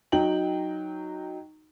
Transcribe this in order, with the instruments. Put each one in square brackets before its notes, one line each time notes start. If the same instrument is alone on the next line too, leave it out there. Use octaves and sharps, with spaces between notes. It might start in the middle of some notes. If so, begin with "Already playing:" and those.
[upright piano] F#3 D#4 G5 F#7